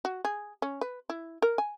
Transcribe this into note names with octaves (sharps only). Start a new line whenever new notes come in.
F#4
G#4
C#4
B4
E4
A#4
G#5